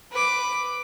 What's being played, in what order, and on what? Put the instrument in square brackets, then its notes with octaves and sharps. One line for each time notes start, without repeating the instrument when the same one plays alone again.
[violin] B4 D6